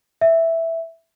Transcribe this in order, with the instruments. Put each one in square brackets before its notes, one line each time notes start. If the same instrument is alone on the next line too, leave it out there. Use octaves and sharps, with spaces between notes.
[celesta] E5